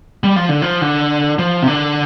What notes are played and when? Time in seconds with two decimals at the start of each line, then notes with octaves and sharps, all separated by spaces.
0.24 G3
0.36 F3
0.49 D3
0.62 F3
0.81 D3
1.39 F3
1.62 C3
1.67 D3